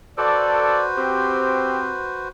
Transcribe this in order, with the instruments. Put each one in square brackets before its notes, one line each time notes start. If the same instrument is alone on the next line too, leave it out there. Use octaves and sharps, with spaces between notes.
[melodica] F#4 B4 C5 [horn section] A4 D5
[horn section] C4 G4